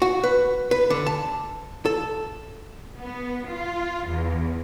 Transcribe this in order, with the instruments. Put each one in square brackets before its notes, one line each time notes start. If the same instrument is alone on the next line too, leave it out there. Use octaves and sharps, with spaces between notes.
[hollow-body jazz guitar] F#4
B4
B4
D3
A5
A4
[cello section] B3
F4
E2